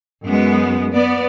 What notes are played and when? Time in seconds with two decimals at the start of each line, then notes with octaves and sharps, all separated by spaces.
0.25 F#2 G#3 B3
0.91 B3 D5